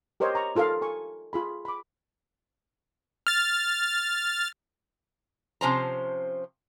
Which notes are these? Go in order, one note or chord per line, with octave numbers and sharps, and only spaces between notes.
G4 A#4 C5 C#5 D#5
A#5 C#6
D#4 F4 A4 A#4 F5
A4 G#5 C#6
F4 G#4 B5
B5 D6
F6 A6
C3 F3 C#4 C5 A5 A#5